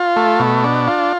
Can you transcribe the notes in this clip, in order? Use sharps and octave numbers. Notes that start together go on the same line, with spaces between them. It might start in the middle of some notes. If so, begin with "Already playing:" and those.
Already playing: F4
A3
B2
D4
F4